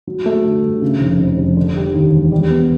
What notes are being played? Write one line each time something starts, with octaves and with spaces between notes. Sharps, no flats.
F#3
A3
D3
G2
C#3
F1
F2
F1
D3
G3
D#2
E1
G3
B3